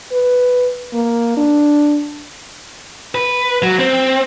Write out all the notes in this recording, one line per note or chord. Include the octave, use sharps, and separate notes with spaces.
B4
A#3
D4
B4
F#3
C4